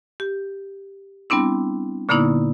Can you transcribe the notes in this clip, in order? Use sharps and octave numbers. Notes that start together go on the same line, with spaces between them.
G4
G3 B3 C4 D4 E4
A#2 D3 A#3 B3 D#4 E4